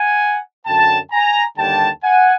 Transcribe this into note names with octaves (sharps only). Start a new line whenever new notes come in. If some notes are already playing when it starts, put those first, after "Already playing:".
Already playing: F#5 G#5
F#2 D3 F#3 G5 A5
G#5 A#5
D#2 D3 G3 G5 A5
F#5 G#5